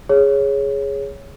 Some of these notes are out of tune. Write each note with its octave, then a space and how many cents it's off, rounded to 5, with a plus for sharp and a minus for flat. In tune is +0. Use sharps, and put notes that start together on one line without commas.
G#4 +0 C#5 +0